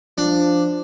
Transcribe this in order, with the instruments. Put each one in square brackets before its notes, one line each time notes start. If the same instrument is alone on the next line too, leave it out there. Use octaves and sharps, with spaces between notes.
[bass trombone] F3 [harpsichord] D4